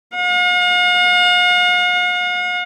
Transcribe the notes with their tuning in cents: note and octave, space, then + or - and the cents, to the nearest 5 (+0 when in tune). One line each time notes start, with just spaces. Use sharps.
F5 +45